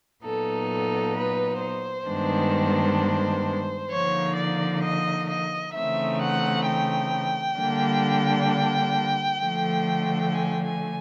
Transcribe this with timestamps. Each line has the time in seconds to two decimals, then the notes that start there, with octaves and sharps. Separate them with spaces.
0.23 A#2 F#3 B3 D#4 A4
0.70 A4
1.15 B4
1.61 C5
2.08 G2 D#3 G#3 B3 D4
3.90 D3 F3 A#3 D#4 C#5
4.36 D5
4.82 D#5
5.29 D#5
5.74 C#3 E3 A3 C4 D#4 E5
6.21 F#5
6.66 G5
7.58 D3 G3 A#3 D4
9.42 D3 F3 A3
10.33 G#5
10.64 G#5